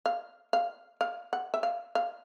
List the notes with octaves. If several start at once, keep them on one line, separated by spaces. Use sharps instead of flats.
F5
F5
F5
F#5
E5
F5
F5